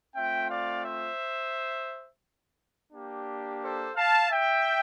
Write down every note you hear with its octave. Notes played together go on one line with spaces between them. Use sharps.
A3 C4 F4 E5 G5
D5 F5
C5 E5
A#3 D4 G4
A4 C5
F5 A5
E5 G5